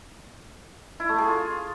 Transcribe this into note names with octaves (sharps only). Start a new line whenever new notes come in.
E4
A3
G#4
F4